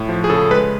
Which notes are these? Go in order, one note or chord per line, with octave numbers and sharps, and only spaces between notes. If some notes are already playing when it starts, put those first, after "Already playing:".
Already playing: A2
F3
G#4
C#3 A4
G#3 B4